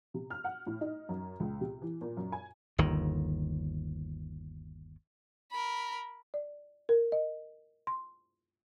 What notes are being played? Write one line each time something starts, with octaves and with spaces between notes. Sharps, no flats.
C3
F6
F#5
A2
D#4
F#2
C#2
C3
E3
A#2
F#2
G#5
G1 D#2 D#3
A#4 B5
D5
A#4
D#5
C6